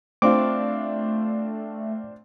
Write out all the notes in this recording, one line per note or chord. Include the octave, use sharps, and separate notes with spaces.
A3 C4 D4 F4 D6